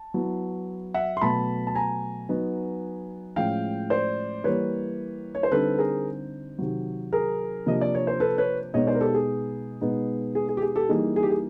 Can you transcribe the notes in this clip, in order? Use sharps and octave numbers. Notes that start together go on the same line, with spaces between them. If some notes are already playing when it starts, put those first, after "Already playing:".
Already playing: A5
F#3 B3 E4
E5 F#5
C6
B2 F#3 A3 A5 B5
A5
G#5 A#5
F#3 B3 D#4
A2 F3 G#3 C#4 F5 G5
C5 D5
E3 G3 A#3 B4 C#5
C#5
C5
D3 G3 C4 D#4 A4 B4
G#4 A#4
C3 D#3 F#3
G#4 A#4
C3 F3 A#3 D4 D#5
D5
C#5
C5
A4 B4
B4 C#5
B2 G#3 B3 D#4 C#5 D#5
C5 D5
A#4
G4 A4
G#4
B2 G#3 B3 D#4
G#4
G#4
G4
G#4
G4 A4
E3 G3 A#3 D#4 G#4
G#4
G4
G#4